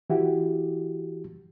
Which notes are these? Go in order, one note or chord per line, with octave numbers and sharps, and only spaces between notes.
E3 E4 F#4 G4